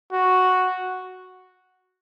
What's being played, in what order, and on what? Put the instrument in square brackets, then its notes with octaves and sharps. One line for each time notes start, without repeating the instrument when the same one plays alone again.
[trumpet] F#4